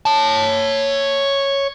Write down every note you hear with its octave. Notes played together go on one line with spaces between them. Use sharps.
C#5 A5